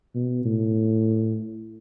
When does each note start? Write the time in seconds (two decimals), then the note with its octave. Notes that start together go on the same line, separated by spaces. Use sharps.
0.15 B2
0.45 A2